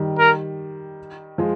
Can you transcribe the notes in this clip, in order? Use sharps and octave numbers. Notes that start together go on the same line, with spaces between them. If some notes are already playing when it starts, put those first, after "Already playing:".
Already playing: D#3 G3
A#4
F3 G#3